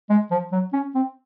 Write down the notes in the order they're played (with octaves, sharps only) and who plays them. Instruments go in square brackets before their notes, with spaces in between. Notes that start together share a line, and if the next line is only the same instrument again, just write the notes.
[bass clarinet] G#3
F3
F#3
C#4
C4